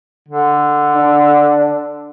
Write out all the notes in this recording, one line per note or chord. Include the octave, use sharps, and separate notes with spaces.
D3
D4